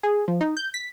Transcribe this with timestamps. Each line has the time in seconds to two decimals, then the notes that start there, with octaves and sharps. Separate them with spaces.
0.03 G#4
0.28 F3
0.41 D#4
0.57 G6
0.74 B6